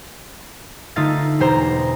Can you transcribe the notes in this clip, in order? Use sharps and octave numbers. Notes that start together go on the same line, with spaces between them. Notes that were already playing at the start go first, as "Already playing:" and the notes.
D3 A3 D#4 F4 A6
E1 G4 C5 A#5